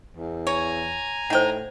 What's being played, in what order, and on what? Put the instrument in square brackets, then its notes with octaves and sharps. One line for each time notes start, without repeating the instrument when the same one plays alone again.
[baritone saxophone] E2
[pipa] C#5 [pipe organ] G#5 A#5
[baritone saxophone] A2 [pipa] D#4 G5 [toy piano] C5 F#5